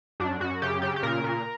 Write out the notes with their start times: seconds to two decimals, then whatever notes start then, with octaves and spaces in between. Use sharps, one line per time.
0.20 F#2 D4
0.40 F#2 F#4
0.62 C#3 G4
0.82 C#3 G4
0.96 G4
1.03 A#2 A#4
1.24 A#2